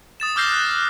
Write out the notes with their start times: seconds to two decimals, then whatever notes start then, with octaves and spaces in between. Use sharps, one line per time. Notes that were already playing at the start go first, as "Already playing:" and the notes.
0.20 D#6 A6 E7
0.36 D6 E6 F6 G6 A#6 C7
0.52 F#6